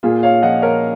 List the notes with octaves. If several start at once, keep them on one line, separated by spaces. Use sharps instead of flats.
A#2 F4 G#4
C#5 F5
F3 D#5 F#5
A#4 C#5